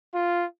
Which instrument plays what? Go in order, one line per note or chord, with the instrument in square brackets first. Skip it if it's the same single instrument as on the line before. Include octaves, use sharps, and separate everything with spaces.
[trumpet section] F4